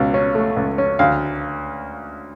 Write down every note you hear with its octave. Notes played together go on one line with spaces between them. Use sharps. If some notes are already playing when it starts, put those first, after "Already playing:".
Already playing: C#2 B2
C#4
A3
C#2
C#4
D2 F5